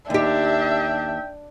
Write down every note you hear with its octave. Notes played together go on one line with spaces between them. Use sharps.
D#2 D4 G4 E5 G5